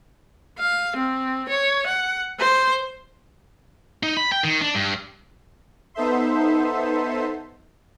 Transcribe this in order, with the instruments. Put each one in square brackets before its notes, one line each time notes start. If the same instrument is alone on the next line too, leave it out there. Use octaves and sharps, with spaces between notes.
[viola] F5
C4
C#5
F#5
C5
[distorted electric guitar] D#4
B5
G5
D#3
D4
G2
[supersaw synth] B3 D#4 A4 C5 E5 C6